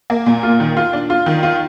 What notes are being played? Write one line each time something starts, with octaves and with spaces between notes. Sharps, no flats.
A#3
A#2
F4
D#3
F4
D4
F4
D#3
F4